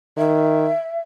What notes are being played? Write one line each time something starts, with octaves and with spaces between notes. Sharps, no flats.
D#3 E5